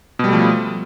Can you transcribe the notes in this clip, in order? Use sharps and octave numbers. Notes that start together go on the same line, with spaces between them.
B2 F3 G3 A3